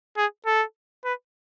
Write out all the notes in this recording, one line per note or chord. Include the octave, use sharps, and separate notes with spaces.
G#4
A4
B4